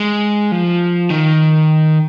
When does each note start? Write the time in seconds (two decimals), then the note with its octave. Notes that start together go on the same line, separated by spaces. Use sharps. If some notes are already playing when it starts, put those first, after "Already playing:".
Already playing: G#3
0.52 F3
1.10 D#3